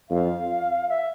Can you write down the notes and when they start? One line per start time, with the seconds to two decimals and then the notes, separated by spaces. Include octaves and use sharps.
0.09 F2 F5
0.89 E5